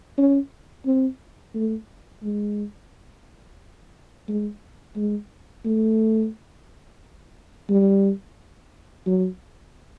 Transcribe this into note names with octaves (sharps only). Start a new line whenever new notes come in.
C#4
C4
A3
G#3
G#3
G#3
A3
G3
F#3